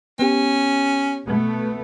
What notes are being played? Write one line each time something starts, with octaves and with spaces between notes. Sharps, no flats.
B3 C#4 G4
B2 A3 B3